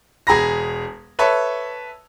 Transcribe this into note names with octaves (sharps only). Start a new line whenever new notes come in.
E1 G#4 A#5 B5 A#6
A4 B4 C#5 E5 A5